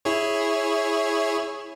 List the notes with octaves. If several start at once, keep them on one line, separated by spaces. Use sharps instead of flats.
E4 G#4 C#5